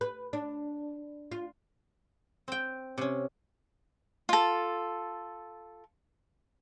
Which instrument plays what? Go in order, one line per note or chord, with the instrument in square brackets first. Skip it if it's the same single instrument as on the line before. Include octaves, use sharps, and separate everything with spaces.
[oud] B4
D4
F4
[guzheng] C4 G5
C3 C#4
[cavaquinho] F4 A4